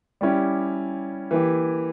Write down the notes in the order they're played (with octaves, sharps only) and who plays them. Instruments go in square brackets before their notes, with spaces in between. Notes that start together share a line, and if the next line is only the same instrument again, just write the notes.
[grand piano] G3 C#4 E4 G4
E3 A#3 E4 G4